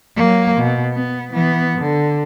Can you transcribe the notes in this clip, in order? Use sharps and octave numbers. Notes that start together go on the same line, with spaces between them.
F#3 A#3
B2
B3
E3 B3
D3